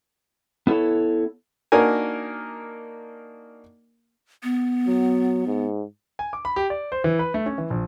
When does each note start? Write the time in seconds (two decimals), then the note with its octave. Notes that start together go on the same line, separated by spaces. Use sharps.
0.67 B3 E4 A4 C#5
1.72 A#3 D4 D#4 F#4 A#4 G#5
4.43 B3
4.87 F#3
5.47 G#2
6.19 G#5
6.33 D6
6.45 B5
6.56 G4
6.70 D5
6.92 C5
7.04 E3
7.19 B4
7.34 A3
7.46 C#4
7.58 E3
7.70 A#1